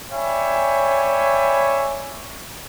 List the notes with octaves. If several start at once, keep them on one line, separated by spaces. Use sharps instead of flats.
C#5 D5 E5 G5 G#5 B5